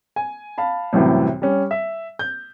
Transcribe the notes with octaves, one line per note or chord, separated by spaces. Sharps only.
G#5
F5 A5 B5
C2 F#2 A2 C3 E3
G3 C#4
E5
G6